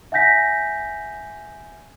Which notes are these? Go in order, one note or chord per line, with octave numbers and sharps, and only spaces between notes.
E5 F#5 G#5 G6 A#6 B6